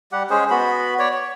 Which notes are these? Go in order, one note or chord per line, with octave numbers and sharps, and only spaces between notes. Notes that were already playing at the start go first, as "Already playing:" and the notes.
G3 G4 F#5
G#3 C#4 G#4 C5
B3 F#4 B5
C#5 D5
C#5